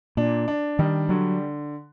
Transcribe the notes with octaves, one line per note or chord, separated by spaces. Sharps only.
A#2 D4
D4
D#3 G3
D3 F#3